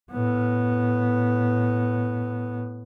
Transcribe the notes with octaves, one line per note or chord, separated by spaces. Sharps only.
A2 B3